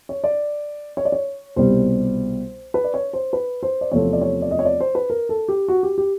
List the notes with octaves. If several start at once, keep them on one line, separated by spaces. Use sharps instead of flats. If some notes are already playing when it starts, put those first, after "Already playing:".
C#5
D5
C#5
D5
C#5
C2 B2 G3 C5
B4
D5
C#5
C5
B4
C5
D5
E2 C3 F3 A3 C4 C#5
D5
C#5
D5
D#5
C#5
D5
C5
B4
A#4
A4
G4
F#4
G4
G4